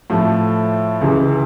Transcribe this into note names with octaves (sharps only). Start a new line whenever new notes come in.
A2 F3 A3
C#2 C#3 E3